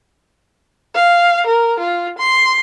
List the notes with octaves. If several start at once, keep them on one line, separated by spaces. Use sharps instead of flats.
F5
A#4
F4
C6